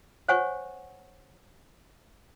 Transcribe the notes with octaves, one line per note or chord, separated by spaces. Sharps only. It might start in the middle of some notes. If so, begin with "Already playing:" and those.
C5 C#5 F#5 G#5 C#6